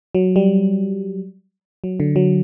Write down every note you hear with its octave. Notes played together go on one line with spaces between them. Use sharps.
F#3
G3
F#3
D3
F#3